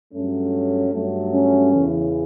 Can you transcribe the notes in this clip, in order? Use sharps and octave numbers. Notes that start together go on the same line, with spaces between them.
G2 F#3 A3 C#4
G2 F#3 A3
C#4
E2 C#3 E3